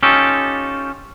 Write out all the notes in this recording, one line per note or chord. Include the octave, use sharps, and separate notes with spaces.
C#4 D#4 F4 G4 A4